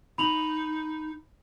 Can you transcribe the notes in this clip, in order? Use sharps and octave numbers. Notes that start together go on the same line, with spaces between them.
D#4 B5 F7 F#7